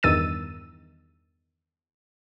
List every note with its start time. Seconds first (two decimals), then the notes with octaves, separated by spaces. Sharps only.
0.03 E2 G2 D#3 E6 A6 D#7